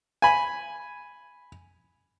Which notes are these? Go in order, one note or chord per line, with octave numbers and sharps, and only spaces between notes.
G#5 B5